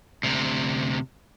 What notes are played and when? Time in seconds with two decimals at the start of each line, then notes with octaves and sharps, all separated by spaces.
0.23 D2 C3